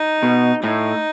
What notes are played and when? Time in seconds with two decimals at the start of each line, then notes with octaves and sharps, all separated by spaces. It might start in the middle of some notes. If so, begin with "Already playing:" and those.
Already playing: D#4
0.23 B2
0.63 A2 D#4